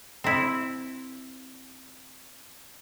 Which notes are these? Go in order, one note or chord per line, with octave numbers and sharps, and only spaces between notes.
C4 E4